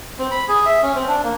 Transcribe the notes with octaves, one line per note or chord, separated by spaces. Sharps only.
C4
B5
G#4
E5
C#4
C4
D4
A#3